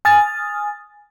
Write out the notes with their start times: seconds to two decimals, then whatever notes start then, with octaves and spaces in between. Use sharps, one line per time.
0.05 G#5 D#6 F6 A6